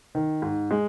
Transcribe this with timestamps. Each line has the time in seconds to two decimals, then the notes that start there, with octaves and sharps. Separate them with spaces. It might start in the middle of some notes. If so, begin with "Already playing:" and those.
0.15 D#3
0.42 G#2
0.71 G#3